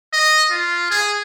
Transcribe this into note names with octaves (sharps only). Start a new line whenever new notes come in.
D#5
F4
G#4